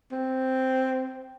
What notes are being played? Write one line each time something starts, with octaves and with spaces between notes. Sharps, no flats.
C4